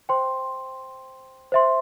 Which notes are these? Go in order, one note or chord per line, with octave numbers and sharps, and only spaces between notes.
C5 G5 C6
C5 E5 C6